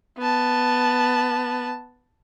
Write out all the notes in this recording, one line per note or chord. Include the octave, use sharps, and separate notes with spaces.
B3 A5